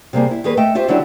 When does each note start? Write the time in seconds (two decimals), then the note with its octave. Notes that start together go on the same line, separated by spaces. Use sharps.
0.13 C3 G3 A#3 G#4
0.31 E4
0.44 D#3 G3 A#3 G#4 A#4 B4
0.57 A3 D#5 E5 G5
0.75 F4 G4 C5 E5
0.88 D3 F#3 C#4 D4 E4 G4